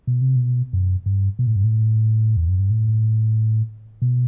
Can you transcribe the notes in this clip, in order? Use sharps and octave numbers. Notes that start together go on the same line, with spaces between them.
B2
C3
B2
F#2
G2
B2
A2
G2
A2
E2
F#2
G2
A2
B2